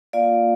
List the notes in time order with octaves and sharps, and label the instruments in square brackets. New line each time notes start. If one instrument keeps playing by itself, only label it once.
[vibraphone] A#3 F4 D5 F5